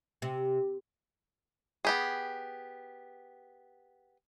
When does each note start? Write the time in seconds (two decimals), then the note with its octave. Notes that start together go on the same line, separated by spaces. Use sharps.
0.22 C3
1.85 B3 G4 G#4